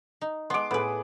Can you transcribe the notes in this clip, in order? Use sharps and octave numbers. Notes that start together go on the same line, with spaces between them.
D#4
G#3 B3 C6 D6
A2 B3 G#4 B4